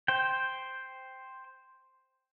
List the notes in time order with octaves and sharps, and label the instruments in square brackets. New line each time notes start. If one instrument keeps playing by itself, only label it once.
[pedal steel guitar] C5 G5